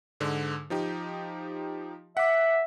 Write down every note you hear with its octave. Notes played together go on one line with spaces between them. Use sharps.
G#2 D3
F3 D#4 G4
E5 F#5 D6